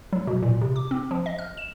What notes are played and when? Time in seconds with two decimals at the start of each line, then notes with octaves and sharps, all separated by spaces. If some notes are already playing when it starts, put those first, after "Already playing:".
0.13 F#3
0.27 B2
0.42 A#2
0.61 C3
0.76 D6
0.91 C4
1.11 F3
1.26 D#5
1.39 F6
1.57 E7